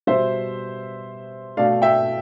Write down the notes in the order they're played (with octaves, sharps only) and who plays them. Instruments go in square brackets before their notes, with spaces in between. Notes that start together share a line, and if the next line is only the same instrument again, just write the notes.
[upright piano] B2 G3 C5 E5
B2 A3 D5 F5
E5 G5